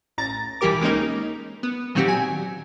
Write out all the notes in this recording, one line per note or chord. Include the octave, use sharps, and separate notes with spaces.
A1 A#5 A6
B1 E3 G3 G4 A#4 D6
G#3 A#3 C#4 D#4 A#4
B3
A#2 D#3 F#3 C4 F#4 G4
G#5